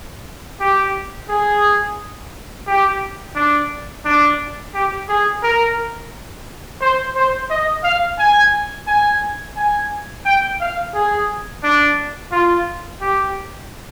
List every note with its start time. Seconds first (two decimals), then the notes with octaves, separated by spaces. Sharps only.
0.60 G4
1.29 G#4
2.67 G4
3.35 D4
4.05 D4
4.74 G4
5.09 G#4
5.43 A#4
6.81 C5
7.15 C5
7.50 D#5
7.84 F5
8.19 G#5
8.87 G#5
9.57 G#5
10.25 G5
10.60 F5
10.94 G#4
11.63 D4
12.32 F4
13.01 G4